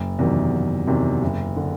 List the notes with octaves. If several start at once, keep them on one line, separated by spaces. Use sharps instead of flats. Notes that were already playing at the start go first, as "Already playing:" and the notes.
Already playing: F#1
E2 C3 D#3 F#3
F#1
E2 C3 D#3 F#3
F#1
D3